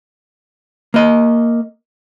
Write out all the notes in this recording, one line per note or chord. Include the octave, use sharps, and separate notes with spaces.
A#3 D#5